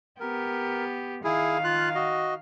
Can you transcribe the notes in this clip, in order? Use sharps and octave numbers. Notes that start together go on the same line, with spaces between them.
B3 G4 A#4
D#3 E4 G#4 F5
F4 F#6
F#4 D#5